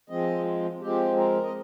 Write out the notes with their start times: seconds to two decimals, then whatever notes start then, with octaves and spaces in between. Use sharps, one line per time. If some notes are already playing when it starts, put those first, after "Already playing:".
0.10 F3 G#3 C4 D#5
0.81 F3 G#3 C4 G4
1.17 A#4
1.44 D#5